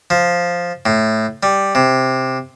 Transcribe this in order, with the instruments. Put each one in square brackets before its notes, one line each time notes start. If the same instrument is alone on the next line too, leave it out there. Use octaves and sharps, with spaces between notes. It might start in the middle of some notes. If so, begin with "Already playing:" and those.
[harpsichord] F3
A2
G3
C3